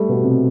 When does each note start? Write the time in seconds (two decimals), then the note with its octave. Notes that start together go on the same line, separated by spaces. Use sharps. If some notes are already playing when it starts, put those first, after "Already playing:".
Already playing: G3 A3
0.09 B2
0.23 C3